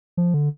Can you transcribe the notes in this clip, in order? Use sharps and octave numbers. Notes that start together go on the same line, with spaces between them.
F3
D3